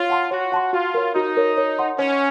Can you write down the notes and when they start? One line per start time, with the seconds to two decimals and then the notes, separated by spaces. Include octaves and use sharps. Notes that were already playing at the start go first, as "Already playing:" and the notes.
Already playing: F4 C#5
0.10 F#5 A5 C6
0.31 F#4 C#5
0.52 F#5 A5 C6
0.73 F4 F#4
0.94 A#4 C#5
1.15 D#4 F#4
1.37 A#4 C#5
1.57 C#5
1.79 F#5 C6
1.99 C#4 C#5